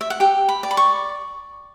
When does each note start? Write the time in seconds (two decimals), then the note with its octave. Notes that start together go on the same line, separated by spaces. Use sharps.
0.01 E5
0.10 F#5
0.20 G4 G5
0.49 B5
0.63 D5
0.71 B5
0.77 C#6